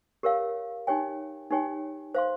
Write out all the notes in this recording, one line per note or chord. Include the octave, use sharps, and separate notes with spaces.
G4 A#4 C#5 F5
D#4 G4 C#5 G5
D#4 G4 C#5 G5
C5 F5 C6